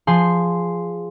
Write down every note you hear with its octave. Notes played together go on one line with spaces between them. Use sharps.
F3 G#4 C6